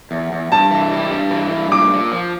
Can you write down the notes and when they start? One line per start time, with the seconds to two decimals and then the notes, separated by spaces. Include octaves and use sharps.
0.11 E2
0.32 E2
0.52 G2 A5
0.71 E3
0.92 G3
1.11 G2
1.31 E3
1.51 G2
1.71 A#2 D6
1.90 A#2
2.12 F3